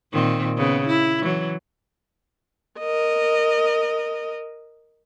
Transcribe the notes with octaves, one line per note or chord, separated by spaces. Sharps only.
A#2 D#3 C4
C#3 B3
E4
E3 F#3
A#4 D#5